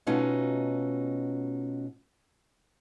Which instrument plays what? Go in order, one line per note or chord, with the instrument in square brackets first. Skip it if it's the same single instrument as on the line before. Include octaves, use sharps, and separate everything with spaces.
[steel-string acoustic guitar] B2 A3 C#4 D#4 F4 F#4